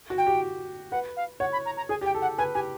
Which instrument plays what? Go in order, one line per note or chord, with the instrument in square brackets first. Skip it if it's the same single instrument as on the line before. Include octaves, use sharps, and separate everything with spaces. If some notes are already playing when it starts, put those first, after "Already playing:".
[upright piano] F#4
[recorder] G5
[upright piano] G4
[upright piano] B4 [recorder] F#5
[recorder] F5
[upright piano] C#5 [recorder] F#5
[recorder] B5
A#5
A#5
[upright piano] G#4 [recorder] G#5
[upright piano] G4
[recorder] G5
[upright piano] A4
[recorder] F#5
[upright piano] B4 [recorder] G#5
[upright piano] G4 [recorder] G#5